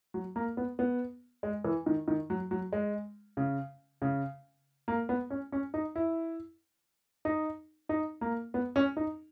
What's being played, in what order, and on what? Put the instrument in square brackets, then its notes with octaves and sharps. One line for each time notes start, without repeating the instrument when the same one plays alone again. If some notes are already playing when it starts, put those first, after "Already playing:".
[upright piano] F#3
A#3
B3
B3
G#3
E3
D#3
D#3
F#3
F#3
G#3
C#3
C#3
A#3
B3
C#4
C#4
D#4
E4
D#4
D#4
A#3
B3
C#4
D#4